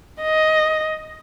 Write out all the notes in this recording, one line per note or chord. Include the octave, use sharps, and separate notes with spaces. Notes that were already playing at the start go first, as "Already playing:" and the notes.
D#5